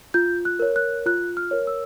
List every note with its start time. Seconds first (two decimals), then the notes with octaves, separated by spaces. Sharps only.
0.14 F4 G6
0.45 F#6
0.59 A#4 C#5
0.76 F#6
1.06 F4 F#6
1.37 F6
1.51 A#4 C#5
1.67 E6